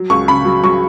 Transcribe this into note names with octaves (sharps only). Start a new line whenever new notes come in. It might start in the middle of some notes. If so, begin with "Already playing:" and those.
Already playing: F#3
C#2 C#6
C#3 B5
F#3
F#3 C#6